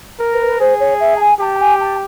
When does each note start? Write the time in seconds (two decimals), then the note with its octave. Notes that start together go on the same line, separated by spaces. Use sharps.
0.19 A#4
0.33 B4
0.46 B4
0.59 G#4 C5
0.79 C#5
1.00 E5
1.16 A5
1.19 G#5
1.39 G4 A5
1.60 G#5
1.80 A5